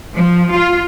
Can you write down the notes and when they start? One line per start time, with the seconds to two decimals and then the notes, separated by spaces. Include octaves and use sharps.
0.14 F3
0.53 F4